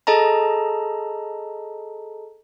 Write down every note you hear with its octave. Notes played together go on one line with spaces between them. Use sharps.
G#4 A4 D#5 A5 A#5